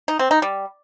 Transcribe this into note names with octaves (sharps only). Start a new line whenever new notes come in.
D#4
C4
D#4
G3